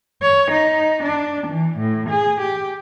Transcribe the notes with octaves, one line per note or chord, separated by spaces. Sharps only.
C#5
D#4
D4
E3
A2
G#4
G4